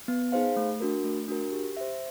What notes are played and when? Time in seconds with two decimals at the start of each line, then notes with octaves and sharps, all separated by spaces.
0.08 B3
0.32 D#4 G#4 C5 F5
0.56 A3
0.80 D4 F#4 A#4
1.04 A3
1.28 D4 F#4 A#4
1.52 G4
1.77 C5 E5